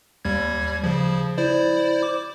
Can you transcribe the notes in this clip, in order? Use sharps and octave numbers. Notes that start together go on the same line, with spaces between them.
D#2 G3 G#6
C#3 F3
E4 C5 D5
D6